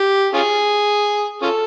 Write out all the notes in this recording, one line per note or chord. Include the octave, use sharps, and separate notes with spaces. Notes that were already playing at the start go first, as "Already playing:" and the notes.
Already playing: G4
C#4 F4 G#4
C#4 F4 A4